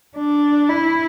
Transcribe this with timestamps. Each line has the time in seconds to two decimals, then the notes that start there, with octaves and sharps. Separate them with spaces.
0.17 D4
0.69 E4